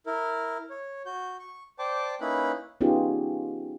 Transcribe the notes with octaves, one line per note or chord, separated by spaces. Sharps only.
E4 A#4
C#5
F#4 G6
C#6
C5 D5 G5 A5 D6
A#3 C#4 D#4 E4 B4 B5
B3 C#4 D#4 F4 G4 G#4